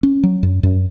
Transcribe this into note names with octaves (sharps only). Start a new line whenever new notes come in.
C#4
F#3
F#2
F#2